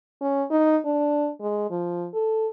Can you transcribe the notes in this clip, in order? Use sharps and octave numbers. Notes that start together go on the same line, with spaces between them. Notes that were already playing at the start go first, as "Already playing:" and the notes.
C#4
D#4
D4
G#3
F3
A4